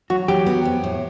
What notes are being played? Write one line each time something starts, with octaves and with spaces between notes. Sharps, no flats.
F#3 F#4
F#3 G4
B3
F2
A2